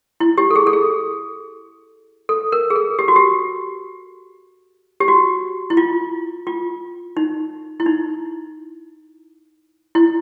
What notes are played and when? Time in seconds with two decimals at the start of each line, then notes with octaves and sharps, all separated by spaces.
0.20 E4
0.38 G4
0.51 A4
0.56 G#4
0.67 A4
0.73 G#4
2.29 A4
2.52 A#4
2.70 G#4
2.76 A4
2.99 G4
3.08 F#4
3.16 G4
5.00 G4
5.08 F#4
5.70 E4
5.77 F4
6.47 F4
7.17 D#4
7.80 E4
7.86 D#4
9.95 E4